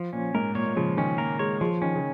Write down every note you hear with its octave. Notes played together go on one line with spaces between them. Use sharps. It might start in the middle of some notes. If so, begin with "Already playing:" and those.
Already playing: F3
A#2 C#4
G#2 A#4
A#2 C#5
A#2
C#3 F3
D#3 C#4
A#3 A#4
G#3 C#5
F3 G#3
D#3 C#4
C#3